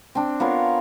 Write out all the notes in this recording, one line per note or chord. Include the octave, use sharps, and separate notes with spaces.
C4 D4
B3 F4 A#4 C#5